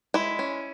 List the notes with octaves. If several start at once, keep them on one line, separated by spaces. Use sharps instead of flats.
G#3 E4
C#4